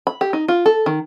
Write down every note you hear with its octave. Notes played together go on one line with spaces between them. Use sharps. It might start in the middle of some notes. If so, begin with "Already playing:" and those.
B5
G4
D#4
F4
A4
D#3